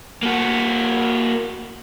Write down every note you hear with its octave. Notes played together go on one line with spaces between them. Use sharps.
A#3 F#4